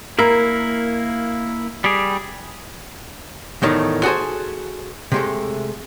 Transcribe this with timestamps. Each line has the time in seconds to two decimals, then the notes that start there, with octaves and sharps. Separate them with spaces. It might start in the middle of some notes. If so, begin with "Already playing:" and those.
0.19 A#3 E4 A#4
1.84 G3 G4 G#4
3.62 E2 A2 D#3 A3
4.03 F#4 G#4 A4 C5 G#5
5.12 C3 G#3 A3